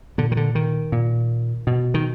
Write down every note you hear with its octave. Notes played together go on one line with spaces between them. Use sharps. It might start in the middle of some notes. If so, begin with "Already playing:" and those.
A#2 D3
D#3
D3
D#3
A#2
B2
D#3